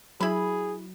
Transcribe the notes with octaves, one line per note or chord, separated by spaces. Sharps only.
F#3 E4 G#4 B5